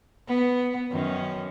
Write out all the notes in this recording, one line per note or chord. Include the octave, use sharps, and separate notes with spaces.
B3
F#2 D#3 C#4